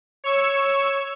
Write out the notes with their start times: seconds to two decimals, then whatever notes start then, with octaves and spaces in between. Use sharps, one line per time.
0.24 C#5 C#6 E6